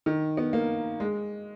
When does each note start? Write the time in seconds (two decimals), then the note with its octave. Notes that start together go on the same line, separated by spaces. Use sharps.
0.06 D#3
0.37 B3
0.53 A#3
1.00 G#3